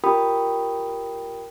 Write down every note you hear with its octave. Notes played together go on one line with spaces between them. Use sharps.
F4 G4 A#4 G5 B5 D#6